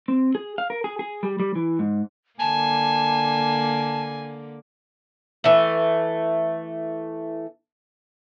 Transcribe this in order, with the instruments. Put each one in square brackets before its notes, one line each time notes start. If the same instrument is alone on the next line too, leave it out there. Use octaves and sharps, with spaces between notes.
[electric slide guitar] C4
G#4
F5
A#4
G#4
G#4
G3
G3
E3
G#2
[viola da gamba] D3 A#3 [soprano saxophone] G#5 [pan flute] A5
[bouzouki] E3 A3